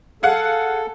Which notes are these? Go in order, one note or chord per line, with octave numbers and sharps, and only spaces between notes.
G#4 A4 F5 F#5